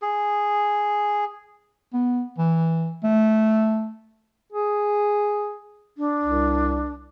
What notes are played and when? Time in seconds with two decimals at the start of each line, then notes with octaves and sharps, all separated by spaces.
0.02 G#4
1.94 B3
2.38 E3
3.04 A3
4.52 G#4
5.98 D4
6.23 C2